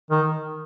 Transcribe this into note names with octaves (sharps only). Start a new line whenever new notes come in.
D#3